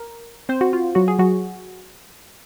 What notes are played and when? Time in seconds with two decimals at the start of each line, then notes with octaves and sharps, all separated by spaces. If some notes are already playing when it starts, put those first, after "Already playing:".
Already playing: A#4
0.49 C4 C5
0.61 F#4
0.73 F4
0.95 F#3 F#4
1.08 G#4
1.19 F#3 F#4